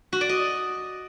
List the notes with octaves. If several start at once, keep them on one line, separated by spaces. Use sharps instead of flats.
F#4
D5
D#5